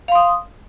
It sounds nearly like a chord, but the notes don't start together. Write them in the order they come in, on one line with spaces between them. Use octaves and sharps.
F5 C6 D#6